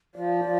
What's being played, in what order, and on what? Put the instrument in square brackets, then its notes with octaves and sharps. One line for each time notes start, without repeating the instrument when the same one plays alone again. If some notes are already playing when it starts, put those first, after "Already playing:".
[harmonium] F3 [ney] D5
[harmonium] F3